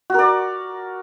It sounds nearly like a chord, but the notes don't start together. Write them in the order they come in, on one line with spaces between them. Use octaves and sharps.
F#4 A#4 D5